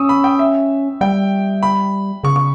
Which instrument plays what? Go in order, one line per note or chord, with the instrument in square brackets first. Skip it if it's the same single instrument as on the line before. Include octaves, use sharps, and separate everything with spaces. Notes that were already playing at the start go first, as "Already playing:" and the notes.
Already playing: [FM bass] C#4 [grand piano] C#6 D#6 E6
[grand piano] B5
G5
E5
[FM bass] G3 [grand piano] G5
[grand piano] B5
[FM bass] C#3 [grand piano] C#6
[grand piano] C#6